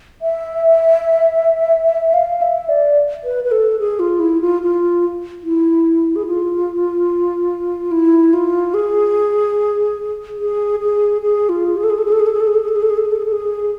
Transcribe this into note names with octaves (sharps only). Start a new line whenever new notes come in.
E5
F5
E5
D5
B4
B4
A4
G#4
F4
E4
F4
F4
E4
G#4
F4
E4
F4
G#4
G#4
G#4
G#4
F4
G#4
A4
G#4
A4
G#4
A4
G#4
A4
G#4
A4
G#4
A4
G#4
A4
G#4
A4
G#4
A4
G#4
A4
G#4
A4
G#4